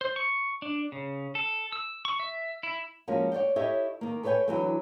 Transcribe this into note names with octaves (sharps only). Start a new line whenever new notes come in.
C5
C#6
D4
C#3
A4
E6
C#6
E5
E4
F3 G#3 A#3 C#4 F#4
C#5 D5 F#5 G5
E4 G4 A4 C#5 D#5 E5
D#3 A#3
A4 B4 C#5 D5 G5 G#5
D3 E3 F#3 A3